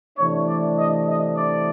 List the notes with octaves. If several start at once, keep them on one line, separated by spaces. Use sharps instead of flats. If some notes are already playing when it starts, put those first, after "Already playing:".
C3 E3 A3 D4 C#5
D5
D#5
D#5
D5